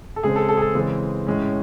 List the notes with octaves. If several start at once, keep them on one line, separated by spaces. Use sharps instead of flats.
A4
C#3 G#3 C4 G#4
A4
A4
G#4
A4
C#3 E3 G#3 C4
A2 G#3 C#4